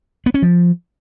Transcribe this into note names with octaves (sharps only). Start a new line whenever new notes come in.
B3
C#4
F3